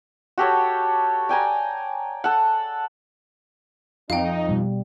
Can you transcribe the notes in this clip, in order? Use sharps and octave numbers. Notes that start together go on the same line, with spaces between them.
F#4 G4 A4 C#5
D5 G5 G#5 A#5
A4 F#5
F2 D#4 F5 G5
B2 G3